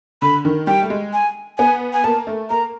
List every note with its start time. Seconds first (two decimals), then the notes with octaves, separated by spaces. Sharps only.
0.22 D3 B5
0.45 D#3
0.67 G3 G5
0.82 A3
0.90 G#3
1.13 G#5
1.58 B3 G#5
1.93 G#5
2.04 A#3 A5
2.27 A3
2.50 A#3 A#5